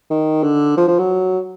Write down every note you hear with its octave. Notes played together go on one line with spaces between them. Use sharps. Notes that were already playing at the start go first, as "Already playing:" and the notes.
D#3
D3
F3
F3
F#3